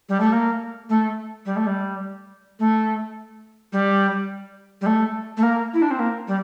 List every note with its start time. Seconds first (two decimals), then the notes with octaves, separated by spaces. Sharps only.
0.09 G3
0.20 A3
0.32 A#3
0.89 A3
1.45 G3
1.56 A3
1.66 G3
2.59 A3
3.72 G3
4.81 G3
4.86 A3
5.37 A3
5.42 A#3
5.73 E4
5.82 D4
5.90 C4
5.99 A#3
6.27 G3